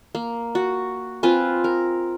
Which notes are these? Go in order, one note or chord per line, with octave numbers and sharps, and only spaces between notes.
A#3
F#4
C4 F4 B4 G#5
A#4